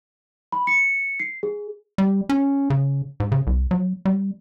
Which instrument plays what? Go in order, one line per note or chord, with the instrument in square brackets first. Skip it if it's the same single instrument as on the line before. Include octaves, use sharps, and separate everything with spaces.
[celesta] B5
C#7
C7
G#4
[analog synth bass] G3
C#4
C#3
G#2
C#3
C2
F#3
G3